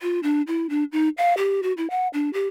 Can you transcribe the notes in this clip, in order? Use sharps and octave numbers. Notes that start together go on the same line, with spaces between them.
F4
D4
E4
D4
D#4
F5
G4
F#4
E4
F#5
D4
G4